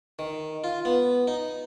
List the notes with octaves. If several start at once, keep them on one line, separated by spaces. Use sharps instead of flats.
D#3
F4
B3
D#4